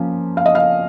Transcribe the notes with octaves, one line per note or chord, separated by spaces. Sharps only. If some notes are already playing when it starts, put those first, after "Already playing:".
Already playing: F3 A#3 C#4
F5
D#5
F5